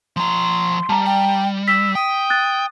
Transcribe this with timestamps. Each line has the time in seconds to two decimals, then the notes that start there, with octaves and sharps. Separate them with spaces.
0.17 F3 A#5 C6
0.89 G3 A5 A#5
1.06 G5
1.68 E6 B6
1.95 G5 D#6
2.30 F#6 A6